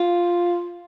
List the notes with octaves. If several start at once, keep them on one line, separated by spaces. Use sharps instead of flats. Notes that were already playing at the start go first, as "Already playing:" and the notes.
Already playing: F4